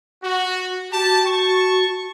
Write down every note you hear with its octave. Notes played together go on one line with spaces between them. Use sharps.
F#4
F#4 G4 A5
A5 C#6